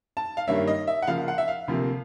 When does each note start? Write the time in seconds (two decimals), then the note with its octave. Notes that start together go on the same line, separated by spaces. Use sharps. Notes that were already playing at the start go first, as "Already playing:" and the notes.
0.17 A5
0.37 F5
0.47 G2 D#3 G3 A#3 C#4 E5
0.67 D#5
0.87 E5
1.02 F#5
1.07 C#3 F3 A#3 F5
1.28 F#5
1.38 E5
1.48 F5
1.68 D2 C3 F3 A#3